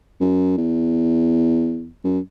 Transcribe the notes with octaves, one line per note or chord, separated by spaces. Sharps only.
F#2
E2
F#2